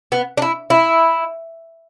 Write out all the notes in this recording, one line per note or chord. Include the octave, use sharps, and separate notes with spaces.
B3
D4
E4
E4